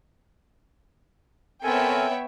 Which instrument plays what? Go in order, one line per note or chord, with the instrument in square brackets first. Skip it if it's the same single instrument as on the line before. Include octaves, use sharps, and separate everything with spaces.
[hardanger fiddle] B3 [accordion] C4 A4 A#4 [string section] C#5 E5 G5 [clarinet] G#5